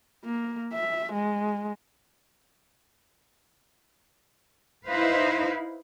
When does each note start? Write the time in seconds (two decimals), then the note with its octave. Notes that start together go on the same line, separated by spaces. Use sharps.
0.25 A#3
0.73 E5
1.13 G#3
4.86 D#4 E4 B4 C5 F5